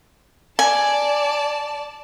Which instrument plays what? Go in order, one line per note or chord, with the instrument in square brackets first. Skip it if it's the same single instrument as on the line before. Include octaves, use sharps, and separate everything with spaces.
[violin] D5 A5 [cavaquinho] G#5